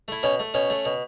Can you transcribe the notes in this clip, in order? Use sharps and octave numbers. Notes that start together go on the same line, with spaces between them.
A3 E4
B2 C#4
A3
B2 C#4
A3
B2